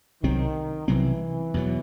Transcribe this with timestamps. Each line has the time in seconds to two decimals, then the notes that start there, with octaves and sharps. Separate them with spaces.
0.23 C2 C3 D#3 F#3 C4
0.88 C2 C3 E3 F#3 C4
1.54 E2 B2 F#3